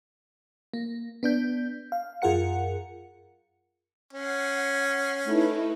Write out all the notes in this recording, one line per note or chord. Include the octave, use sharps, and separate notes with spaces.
A#3
B3 D4 G6
F5
F#2 F4 G#4 A#4 F#5 C#7
C#4 F#5 C7
A3 D#4 E4 B4